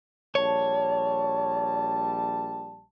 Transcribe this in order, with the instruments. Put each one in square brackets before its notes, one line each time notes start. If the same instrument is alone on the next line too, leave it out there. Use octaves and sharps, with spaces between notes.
[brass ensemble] A#1 G3 A5 [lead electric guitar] C#5